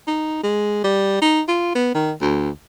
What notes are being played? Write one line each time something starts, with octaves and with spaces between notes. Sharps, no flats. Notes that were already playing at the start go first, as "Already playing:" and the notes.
D#4
G#3
G3
D#4
F4
B3
D#3
D2